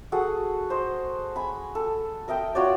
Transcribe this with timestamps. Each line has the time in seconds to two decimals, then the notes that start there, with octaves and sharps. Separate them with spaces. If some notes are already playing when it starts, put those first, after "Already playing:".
0.12 F#4 G#4 A4 F#5
0.70 C5 D#5
1.36 G#5 B5
1.75 A4
2.28 A#4 D#5 E5 G5
2.55 F4 F#4 C#5 D5